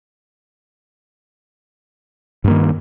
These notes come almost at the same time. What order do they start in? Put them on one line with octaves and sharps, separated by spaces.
G2 A#3 D#3